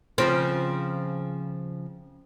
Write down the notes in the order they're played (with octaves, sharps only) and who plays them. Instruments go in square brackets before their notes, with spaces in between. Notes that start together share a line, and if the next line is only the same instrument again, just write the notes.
[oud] C#3 F3 C4